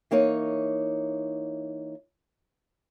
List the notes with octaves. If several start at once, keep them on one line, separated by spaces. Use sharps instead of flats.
E3 A#3 D#4 C#5